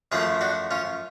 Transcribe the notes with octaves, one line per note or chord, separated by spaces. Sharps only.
F#2 F3 A3 F4 G#4
D4 F#4
C#4 F4